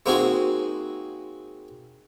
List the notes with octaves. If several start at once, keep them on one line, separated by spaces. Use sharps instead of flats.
G#3 A#3 C4 D#4 F#4 G#4